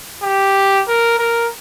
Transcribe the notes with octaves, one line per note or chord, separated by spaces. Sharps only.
G4
A#4
A#4